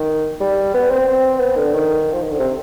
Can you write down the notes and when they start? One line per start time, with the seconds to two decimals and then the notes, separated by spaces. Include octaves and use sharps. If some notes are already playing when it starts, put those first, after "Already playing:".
Already playing: D#3
0.40 G3
0.74 B3
0.91 C4
1.08 C4
1.40 B3
1.57 D3
1.73 D#3
2.13 F3
2.22 D#3
2.31 D3
2.40 C3